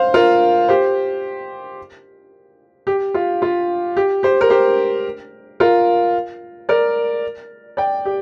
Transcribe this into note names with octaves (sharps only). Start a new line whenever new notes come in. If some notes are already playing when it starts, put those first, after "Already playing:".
Already playing: C5 F5
F4 A#4
G4 C5
G4
F4
F4
G4
G4 C5
A#4
G4 C5
F4 A#4
A#4 D5
D5 G5
G4